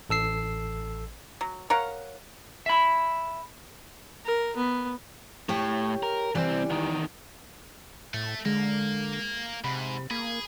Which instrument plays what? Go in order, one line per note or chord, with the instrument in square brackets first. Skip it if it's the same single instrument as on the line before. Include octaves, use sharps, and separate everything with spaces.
[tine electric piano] A1 A4 E6 C7
[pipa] F#3
A#4 C#5 F5 F#5
[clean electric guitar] E5 B5
[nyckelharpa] A#4
B3
[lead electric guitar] A2 [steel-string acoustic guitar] G4 C#5
[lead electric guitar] A#4
[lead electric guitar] C2 C4 [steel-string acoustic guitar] E3 G3 D5
[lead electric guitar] E2 D#3
[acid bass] A2 [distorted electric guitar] A3
[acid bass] D3 [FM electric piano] G#3 [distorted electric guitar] A#3
[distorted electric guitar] G#2 [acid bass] C3 [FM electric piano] B5
[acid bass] A#3 [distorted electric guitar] G#4 [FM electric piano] B5